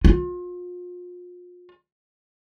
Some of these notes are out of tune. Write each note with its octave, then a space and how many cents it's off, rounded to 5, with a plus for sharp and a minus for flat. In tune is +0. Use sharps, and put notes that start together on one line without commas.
F4 +35